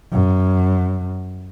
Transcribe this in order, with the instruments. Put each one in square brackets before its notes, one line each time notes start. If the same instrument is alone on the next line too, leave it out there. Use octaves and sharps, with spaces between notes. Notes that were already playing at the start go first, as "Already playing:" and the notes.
[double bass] F#2